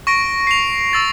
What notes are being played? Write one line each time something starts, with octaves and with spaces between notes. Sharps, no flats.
C#6 A#6 D7
C7 F7
C#6 E6 A6